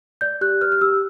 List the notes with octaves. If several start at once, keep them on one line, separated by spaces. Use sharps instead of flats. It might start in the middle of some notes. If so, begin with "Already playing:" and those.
D5 G6
G4 F#6
B4 F6
F6
G4 E6